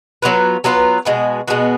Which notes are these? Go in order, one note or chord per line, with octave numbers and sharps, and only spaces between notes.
F#3 B3 F4 B4
F#3 B3 F4 B4
B2 G#3 B3 F#4
B2 G#3 B3 F#4